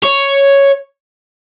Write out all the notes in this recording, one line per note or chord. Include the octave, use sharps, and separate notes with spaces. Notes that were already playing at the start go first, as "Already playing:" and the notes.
C#5